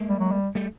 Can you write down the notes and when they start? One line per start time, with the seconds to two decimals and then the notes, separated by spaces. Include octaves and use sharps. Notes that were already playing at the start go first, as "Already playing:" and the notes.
Already playing: G#3 A#3
0.08 G3
0.20 F#3
0.32 G3
0.55 G3 A3